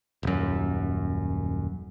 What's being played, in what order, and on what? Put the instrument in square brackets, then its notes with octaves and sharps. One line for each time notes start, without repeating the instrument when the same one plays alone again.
[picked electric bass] D#1 F#2